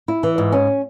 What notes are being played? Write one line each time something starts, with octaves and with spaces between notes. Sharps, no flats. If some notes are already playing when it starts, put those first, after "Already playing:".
E4
E3
G#2
C#4